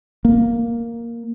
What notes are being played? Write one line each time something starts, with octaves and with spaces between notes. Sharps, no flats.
A#3